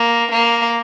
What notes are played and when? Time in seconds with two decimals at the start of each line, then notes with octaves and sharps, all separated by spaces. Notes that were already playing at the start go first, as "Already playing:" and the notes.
Already playing: A#3
0.31 A#3